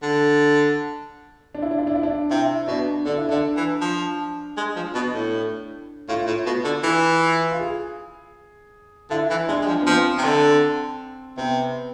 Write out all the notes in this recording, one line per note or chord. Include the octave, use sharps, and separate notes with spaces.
D3
D4
E4
D4
E4
D4
E4
D4
C3 E4
B2 D4
D3 D4
E4
D3 D4
E3
F3
G#3
F3
B2
A2
A2 F4
A2
B2
D3
E3
F4
G#4
D3 E4
E3
G#3 D4
G#3
F3
B3
F3 C4
C3
D3
C3 B3